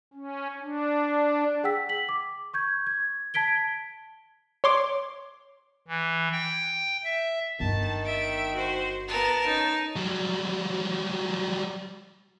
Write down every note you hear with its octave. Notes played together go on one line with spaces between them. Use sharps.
C#4
D4
G#4 F#5 G5 E6 B6
B6 F#7
D6
C#6 G6 G#6
G#6
A5 G#6 B6 D7 G7
C#5 C6 D6
E3
G5
E5
G1 D#3 A5
E5 D7
F#4 C5
B3 A#4 A5
C#4 D#4
F#3 G3